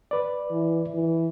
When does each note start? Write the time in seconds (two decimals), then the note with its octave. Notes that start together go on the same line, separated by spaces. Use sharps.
0.11 B4 D5
0.51 E3
0.94 E3